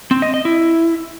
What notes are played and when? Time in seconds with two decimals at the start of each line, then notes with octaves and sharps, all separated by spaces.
0.11 C4
0.22 D#5
0.34 D#5
0.45 E4